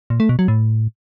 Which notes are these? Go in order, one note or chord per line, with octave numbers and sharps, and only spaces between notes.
A#2
A3
B2
F#3
A2